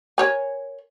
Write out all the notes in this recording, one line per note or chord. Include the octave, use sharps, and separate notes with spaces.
A#4 C#5 G#5